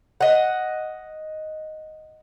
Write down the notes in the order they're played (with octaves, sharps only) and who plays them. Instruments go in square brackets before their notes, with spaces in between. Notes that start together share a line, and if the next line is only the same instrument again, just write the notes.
[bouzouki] D#5 F#5